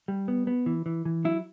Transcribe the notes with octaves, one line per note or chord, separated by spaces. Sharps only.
G3
B3
B3
E3
E3
E3
F#3 E4